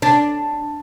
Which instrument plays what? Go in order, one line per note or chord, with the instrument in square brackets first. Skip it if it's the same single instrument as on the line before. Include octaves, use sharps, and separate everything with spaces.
[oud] D4